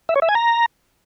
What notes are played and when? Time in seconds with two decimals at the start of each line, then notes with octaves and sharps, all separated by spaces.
0.09 E5
0.16 C#5
0.22 E5
0.29 G#5
0.35 A#5